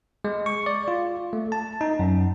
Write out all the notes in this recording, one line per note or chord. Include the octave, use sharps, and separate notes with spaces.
G#3
C#6
D5
F4
A3
A5
D#4
F#2